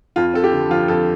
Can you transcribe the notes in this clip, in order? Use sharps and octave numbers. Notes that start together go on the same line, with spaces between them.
F2 F4
C4 A4
G4
D3
F3 F4
F2 A4